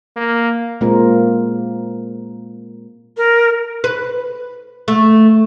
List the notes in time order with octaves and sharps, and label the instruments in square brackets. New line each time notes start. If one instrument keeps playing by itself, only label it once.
[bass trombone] A#3
[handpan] A#2 G#3 A#3 C4 F4 A#4
[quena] A#4
[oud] B4
A3